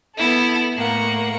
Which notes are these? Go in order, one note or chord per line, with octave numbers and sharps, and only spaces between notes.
B3 E4 A4
A2 A#3 F#5